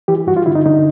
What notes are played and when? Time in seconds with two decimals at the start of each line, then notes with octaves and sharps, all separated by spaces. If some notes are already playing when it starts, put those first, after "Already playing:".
0.08 E3 G4
0.27 G2 F#4
0.37 F4
0.46 D3 E4
0.55 D#4
0.66 D3 D#4